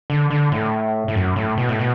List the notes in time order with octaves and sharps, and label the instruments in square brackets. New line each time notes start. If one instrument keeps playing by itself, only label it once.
[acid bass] D3
D3
A2
A2
F#2
A2
B2
A2
B2